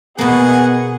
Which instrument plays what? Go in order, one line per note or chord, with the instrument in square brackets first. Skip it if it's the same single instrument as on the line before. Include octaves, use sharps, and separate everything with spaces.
[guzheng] B2 A#3 [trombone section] B3 [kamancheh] G#4 [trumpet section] D#5 F#5 G#5